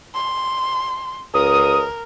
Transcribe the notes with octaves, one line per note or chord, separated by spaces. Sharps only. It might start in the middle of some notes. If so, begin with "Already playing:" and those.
C6
C#2 A#4 D#6